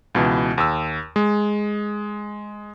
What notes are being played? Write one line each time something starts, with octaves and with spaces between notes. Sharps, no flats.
C#2 B2 E3
D#2 E6
G#3